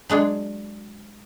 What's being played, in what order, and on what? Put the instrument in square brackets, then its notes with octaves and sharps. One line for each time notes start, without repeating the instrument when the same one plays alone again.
[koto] F#3 G#3 D4 G#4